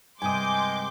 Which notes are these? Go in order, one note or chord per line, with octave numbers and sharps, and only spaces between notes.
G2 C3 G#3 G#5 C6 D6 D#6 G6